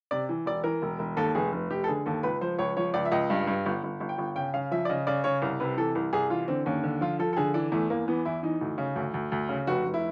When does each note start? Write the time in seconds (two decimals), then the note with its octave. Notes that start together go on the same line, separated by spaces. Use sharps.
0.11 C3 D5
0.29 E3
0.46 E1 D5
0.64 E3 A#4
0.82 E1
0.99 E1
1.17 D#2 A4
1.35 F1 G#4
1.52 F1
1.70 F1 G4
1.84 A4
1.88 D3 G#4
2.06 D#2 A4
2.23 C#2 B4
2.41 F3 C5
2.59 C#2 C#5
2.77 F3 C#5
2.94 C#2 D5
3.05 E5
3.12 C#2 D#5
3.30 G2
3.47 G2
3.66 G1
3.83 G1
4.00 G1
4.09 G5
4.18 G1
4.35 C#3 G5
4.54 C#3 F5
4.71 F3 E5
4.85 D5
4.89 C#3 D#5
5.07 C#3 D5
5.24 C#3 C#5
5.42 C2
5.60 C3 B4
5.77 E3 A4
5.95 C2
6.13 C2 G#4
6.30 E3 F4
6.48 D3 C4
6.66 D#2 C#4
6.84 D3
7.01 F3 F4
7.19 F3 A4
7.33 A4
7.37 D3 G#4
7.54 E3 D4
7.72 E2 A3
7.90 E2 A#3
8.08 E3 B3
8.25 E2 E4
8.43 E3 D#4
8.61 D2
8.78 C#3
8.96 D2
9.14 D2
9.32 D2
9.49 C#3
9.67 F1 F#4
9.84 F1
9.94 E4